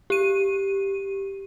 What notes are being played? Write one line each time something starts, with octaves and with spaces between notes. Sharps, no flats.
G4 D#7